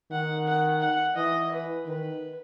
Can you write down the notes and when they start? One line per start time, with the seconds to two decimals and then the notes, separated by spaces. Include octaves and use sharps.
0.11 D#3 F#5
0.46 F#5
0.81 F#5
1.16 E3 D#5
1.52 B4
1.86 D#3 B4